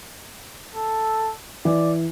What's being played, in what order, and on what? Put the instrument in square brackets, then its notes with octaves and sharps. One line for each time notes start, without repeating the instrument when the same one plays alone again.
[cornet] A4
[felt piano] E3 [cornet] D5